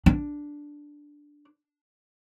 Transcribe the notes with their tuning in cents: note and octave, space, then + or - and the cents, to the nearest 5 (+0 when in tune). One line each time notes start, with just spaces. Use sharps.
D4 -5